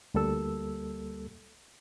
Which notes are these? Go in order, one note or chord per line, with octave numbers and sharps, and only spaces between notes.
D2 G3 A#3 A4 E6